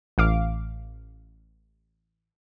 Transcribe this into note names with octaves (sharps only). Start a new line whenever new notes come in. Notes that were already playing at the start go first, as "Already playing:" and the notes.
A1 F5 D6